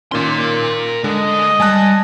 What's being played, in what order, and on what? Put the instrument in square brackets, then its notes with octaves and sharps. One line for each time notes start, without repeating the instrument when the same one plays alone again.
[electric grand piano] A#2 D#3 C#4 [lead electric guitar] A#4 C6
[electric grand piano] D3 [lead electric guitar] G#3 [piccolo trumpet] D#5
[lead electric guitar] G3 [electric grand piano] G#5 A5 F#6